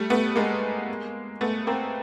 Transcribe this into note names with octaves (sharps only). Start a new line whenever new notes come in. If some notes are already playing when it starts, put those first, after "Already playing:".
Already playing: G3 A3
A3 B3
G#3 A#3
A3 B3
A#3 C4